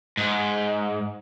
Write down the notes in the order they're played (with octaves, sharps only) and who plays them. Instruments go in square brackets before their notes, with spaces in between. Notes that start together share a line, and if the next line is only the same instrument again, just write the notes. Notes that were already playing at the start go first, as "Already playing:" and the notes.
[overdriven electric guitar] G#2